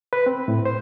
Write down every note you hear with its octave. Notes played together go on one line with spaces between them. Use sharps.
B4
C4
A2
C5